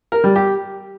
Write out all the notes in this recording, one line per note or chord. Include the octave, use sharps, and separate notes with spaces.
A#4
G3
G4